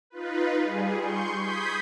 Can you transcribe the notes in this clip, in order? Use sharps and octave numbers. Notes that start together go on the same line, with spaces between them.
D#4 F4 B4
G3 G#4
C6 C#6 G6
B5 C6 D#6 G6 G#6 B6